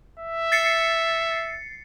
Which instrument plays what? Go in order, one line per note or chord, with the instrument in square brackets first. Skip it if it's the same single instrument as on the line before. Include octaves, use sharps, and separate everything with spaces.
[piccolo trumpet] E5
[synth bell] A6 C7 C#7